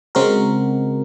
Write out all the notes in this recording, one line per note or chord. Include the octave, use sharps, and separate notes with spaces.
C#3 G#3 C4 F#4 A#4